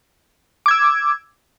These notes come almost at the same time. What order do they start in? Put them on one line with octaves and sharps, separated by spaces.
D6 G#6 E6